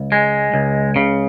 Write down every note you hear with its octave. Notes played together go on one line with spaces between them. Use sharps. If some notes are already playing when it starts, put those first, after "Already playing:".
Already playing: C#2
G#3
C#2
C#3